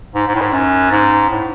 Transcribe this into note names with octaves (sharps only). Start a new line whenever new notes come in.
G#2
G#2
A2
G#2
F#2
G#2
A2